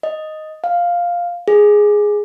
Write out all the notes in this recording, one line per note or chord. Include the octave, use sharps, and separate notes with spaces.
D#5
F5
G#4